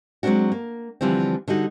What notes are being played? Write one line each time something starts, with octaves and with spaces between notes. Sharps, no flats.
F#3 G#3 A#3 C4 D4 F#4
A#3
D3 E3 F3 G3 C4
D3 G3 D#4 F#4